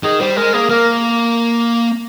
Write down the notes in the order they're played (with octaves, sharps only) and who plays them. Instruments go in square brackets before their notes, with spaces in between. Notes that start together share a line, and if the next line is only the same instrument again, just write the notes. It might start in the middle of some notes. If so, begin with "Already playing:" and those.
[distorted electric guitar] D#3 [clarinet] G#4
[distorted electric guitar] G3 [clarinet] C5
[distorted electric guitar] G#3 [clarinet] A#4
[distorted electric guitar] A#3 [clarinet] G#4
[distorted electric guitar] A#3 [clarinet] A#4